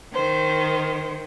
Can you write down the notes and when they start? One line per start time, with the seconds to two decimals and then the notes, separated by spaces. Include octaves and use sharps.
0.14 D#3 C5